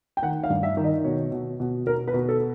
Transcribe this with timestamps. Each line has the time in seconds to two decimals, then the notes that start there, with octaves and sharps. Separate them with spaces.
0.17 G5
0.22 D#3 F#5
0.44 F5
0.50 G2
0.63 E5
0.77 D#3
0.84 D#5
1.04 B2 C#5
1.32 B2
1.60 B2
1.86 B2 A#4
2.07 B4
2.14 B2
2.29 A4